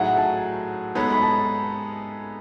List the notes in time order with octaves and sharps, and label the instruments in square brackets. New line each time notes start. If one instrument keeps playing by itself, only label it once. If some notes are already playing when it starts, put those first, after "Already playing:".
Already playing: [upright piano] A2 F#3 A3 D#4 G#4 [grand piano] F#5
[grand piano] A5
[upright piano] G#3 B3 D#4 A4 C#5 [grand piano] B5
[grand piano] B5
A5